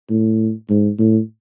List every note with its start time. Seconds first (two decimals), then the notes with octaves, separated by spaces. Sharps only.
0.10 A2
0.70 G#2
0.99 A2